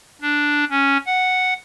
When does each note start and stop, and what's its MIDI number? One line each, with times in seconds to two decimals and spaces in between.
0.22 0.65 62
0.70 0.97 61
1.06 1.54 78